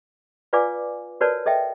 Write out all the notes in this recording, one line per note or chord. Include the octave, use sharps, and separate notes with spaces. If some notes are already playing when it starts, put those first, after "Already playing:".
F4 B4 D5 F5 G#5 D6
F#4 A#4 B4 C#5 D5 A5
A4 D#5 E5 G5